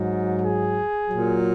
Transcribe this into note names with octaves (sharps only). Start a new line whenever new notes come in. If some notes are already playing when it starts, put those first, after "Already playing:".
Already playing: G#2 F#3
G#4
A#2 F#3